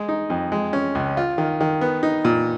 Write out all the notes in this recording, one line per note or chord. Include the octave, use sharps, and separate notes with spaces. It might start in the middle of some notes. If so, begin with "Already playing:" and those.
Already playing: G#3
D#4
F2
G#3
C#4
C#2
F4
D#3
D#3
B3
D#4
A#2